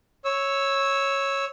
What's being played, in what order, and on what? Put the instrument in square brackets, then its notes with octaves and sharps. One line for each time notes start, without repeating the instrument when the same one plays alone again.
[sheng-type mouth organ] C#5 E6